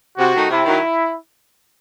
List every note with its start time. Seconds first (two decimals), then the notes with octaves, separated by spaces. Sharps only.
0.17 C3 F#4
0.34 D#3 A3 D#4
0.49 C3 E4
0.65 D#3 F#3